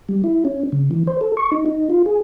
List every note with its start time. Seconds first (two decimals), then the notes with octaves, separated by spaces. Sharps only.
0.09 G3
0.24 E4
0.45 C#4
0.72 C#3
0.91 E3
1.07 C5
1.21 A4
1.37 C#6
1.52 D#4
1.66 D#4
1.90 F4
2.06 G#4